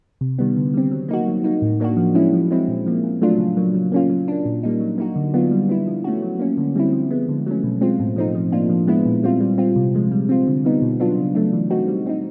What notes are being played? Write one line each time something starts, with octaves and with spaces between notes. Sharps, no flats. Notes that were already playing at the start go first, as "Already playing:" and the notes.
C3
D#3 G3 B3
D3
G3 C4
F#3
A#3 D#4 F#4
F#3
A#3 D#4
A2
F#3 A#3 D4 F#4
F3
G#3 C#4 E4
F3
G#3 C4 E4
A#2
F3 A#3
A#2
F#3 A3 D4 F4
C#3
F#3 A#3
F#3
A#3 C#4 F4
F#3
A#3 D4
A#2
G3 A#3 D#4
F#3
A#3 D#4 F#4
D3
F#3 B3 D4 F4
G3
B3 E4
F3
A3 C#4 F#4
F#3
A#3 C#4
D3
G3 C4 E4
F3
G#3 B3
D3
F#3 A3 C#4
B2
G#3 C4 F4
A2
F3 A3 C4 D#4
F3
A#3 D4 F4
F3
G#3 B3 E4
A#2
G3 C4 F4
G3
C4 F4
C3
F3 G#3
G3
C4 F4
D3
G3 B3 D#4
B2
F#3 B3 D4 F4
C#3
F#3 A3 D4
E3
A3 C4 D#4 F#4
G3
C4 D#4